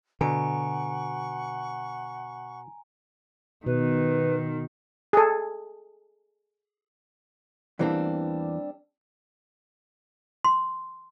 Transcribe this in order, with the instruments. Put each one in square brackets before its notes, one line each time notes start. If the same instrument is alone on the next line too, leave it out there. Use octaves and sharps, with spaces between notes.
[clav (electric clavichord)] B2 [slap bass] D3 [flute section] F#5 C#6 [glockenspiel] G#5 A#5 D7
[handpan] B2 [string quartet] D#3 [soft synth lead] B4
[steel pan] G#4 A4
[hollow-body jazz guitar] E2 E3 A#3 [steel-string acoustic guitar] G3 C4 D4
[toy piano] C6